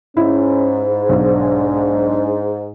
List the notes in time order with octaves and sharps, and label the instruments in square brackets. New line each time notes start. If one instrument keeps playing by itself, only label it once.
[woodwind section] G#2 [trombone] C#4 [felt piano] E4
[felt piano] B1 [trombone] D4